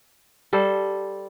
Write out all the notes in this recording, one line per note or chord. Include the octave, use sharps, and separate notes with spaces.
G3 A4 C5